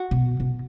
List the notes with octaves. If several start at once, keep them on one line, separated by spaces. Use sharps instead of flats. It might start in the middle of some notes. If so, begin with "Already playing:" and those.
Already playing: F#4
B2
B2